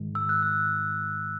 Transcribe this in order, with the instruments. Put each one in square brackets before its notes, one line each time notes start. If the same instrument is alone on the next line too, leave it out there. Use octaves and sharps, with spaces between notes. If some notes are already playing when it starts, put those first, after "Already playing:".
Already playing: [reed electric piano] G#2 D#3 G#3
[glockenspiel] E6
F#6
E6